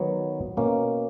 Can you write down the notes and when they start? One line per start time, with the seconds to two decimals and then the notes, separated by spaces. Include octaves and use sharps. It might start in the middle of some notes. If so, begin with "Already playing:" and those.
Already playing: D#3 F#3 B3
0.57 B2 A#3 C#4